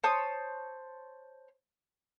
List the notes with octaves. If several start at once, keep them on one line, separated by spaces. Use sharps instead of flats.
C5 C#5 A5 D#6